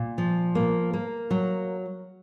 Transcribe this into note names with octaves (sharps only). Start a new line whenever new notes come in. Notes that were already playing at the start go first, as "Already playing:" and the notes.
Already playing: A#2
F3
A#3
A#3
F#3